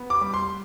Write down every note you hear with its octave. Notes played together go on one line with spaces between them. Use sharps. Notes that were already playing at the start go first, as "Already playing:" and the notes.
Already playing: B3
D6
G3
C6